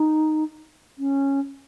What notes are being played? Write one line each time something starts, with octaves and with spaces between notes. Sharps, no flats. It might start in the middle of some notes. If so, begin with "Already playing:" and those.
Already playing: D#4
C#4